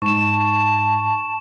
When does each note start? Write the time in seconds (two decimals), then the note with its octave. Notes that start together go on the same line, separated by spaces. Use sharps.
0.02 G#2 A5 C#6 E7